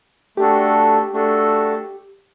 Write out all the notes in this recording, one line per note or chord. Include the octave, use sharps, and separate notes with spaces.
A3 D4 F#4 G4 A4
A3 D4 F#4 A4